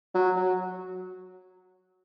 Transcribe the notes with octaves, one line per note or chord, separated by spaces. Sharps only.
F#3
F#3